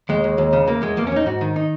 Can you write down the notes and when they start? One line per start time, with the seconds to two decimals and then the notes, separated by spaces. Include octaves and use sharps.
0.09 D#2 G#3
0.24 D#2
0.38 D#2
0.53 C#3
0.67 E2 A#3
0.82 E2 G#3
0.97 E2 A#3
1.07 C#4
1.12 E2 D#4
1.26 G#2 F#4
1.41 D#3
1.56 D#4